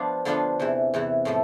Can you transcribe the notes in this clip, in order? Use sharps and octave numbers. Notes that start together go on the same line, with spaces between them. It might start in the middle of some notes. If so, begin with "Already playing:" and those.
Already playing: F3 B3 D4 F4
D3 F3 B3 D4 F4
E2 C3 E3
E2 C3 E3
A2 F3 A3